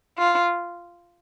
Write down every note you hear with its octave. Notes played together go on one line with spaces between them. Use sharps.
F4